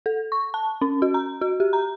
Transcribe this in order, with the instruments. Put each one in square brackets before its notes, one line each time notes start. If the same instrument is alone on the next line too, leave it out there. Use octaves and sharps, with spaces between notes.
[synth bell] A4
C#6
A5
C#4
F#4
A#5
F#4
G4
A#5